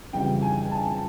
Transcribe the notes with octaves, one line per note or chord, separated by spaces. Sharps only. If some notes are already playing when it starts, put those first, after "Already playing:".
F2 C#3 E3 G3 G5
G#5
A5